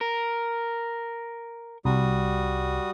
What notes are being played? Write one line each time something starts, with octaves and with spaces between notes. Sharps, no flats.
A#4
C2 G3 F#4 D#6